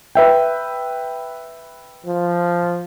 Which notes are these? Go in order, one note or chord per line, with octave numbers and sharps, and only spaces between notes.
B4 E5 G5
F3